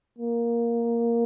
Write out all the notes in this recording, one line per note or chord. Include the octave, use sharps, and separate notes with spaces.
A#3